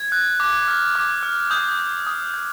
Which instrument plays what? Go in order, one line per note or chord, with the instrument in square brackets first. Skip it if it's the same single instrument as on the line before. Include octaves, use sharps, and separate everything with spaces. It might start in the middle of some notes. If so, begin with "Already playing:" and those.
Already playing: [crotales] G#6
F#6
D6
F6
D6
F6
D#6 G6
G6
D#6
G6